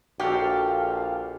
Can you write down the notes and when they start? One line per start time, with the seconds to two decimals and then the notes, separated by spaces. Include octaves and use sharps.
0.20 A#1 F#4 G4 A4 F5